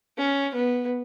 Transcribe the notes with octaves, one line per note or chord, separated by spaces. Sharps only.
C#4
B3